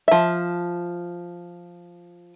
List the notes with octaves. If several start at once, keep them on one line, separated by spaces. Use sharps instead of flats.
F3 E5